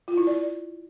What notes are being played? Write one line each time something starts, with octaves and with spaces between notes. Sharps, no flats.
F4
E4
D5